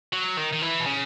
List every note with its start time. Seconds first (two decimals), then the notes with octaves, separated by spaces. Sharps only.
0.13 F#3
0.37 D#3
0.53 D#3
0.62 E3
0.80 B2
0.86 C#3